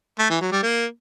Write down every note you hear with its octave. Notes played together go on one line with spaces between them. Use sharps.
A3
E3
F#3
G3
A#3